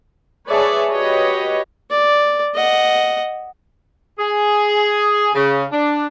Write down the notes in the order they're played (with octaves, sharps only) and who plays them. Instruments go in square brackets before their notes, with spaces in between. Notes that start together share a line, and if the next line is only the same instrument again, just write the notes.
[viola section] G#4 B4 C#5 D5 E5 A5
F#4 G4 B4 C#5 D#5
[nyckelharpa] D5
D#5 F#5
[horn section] G#4
C#3
D4